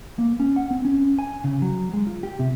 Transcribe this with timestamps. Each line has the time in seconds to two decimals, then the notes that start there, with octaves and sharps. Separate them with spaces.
0.19 A#3
0.40 C#4
0.56 F#5
0.71 C4
0.85 C#4
1.19 G#5
1.44 C#3
1.62 F#3
1.93 G#3
2.07 F4
2.23 G4
2.39 C3